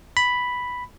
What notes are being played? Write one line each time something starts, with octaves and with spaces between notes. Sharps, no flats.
B5